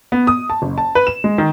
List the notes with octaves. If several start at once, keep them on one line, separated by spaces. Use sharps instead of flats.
B3
D#6
A5
F#1
A5
B4
E7
G#3
D#3